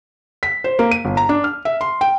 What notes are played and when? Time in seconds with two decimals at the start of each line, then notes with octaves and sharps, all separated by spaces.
0.43 B6
0.64 C5
0.79 A#3
0.91 D#7
1.05 G1
1.17 A#5
1.29 D4
1.44 F6
1.65 E5
1.81 C6
2.01 G5